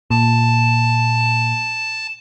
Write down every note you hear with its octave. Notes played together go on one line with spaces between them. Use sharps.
A#2 A5